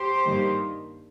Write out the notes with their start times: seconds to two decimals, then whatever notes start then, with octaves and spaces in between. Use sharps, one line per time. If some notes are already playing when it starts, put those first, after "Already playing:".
Already playing: G4 C5
0.24 G2 D#3 G3 A#3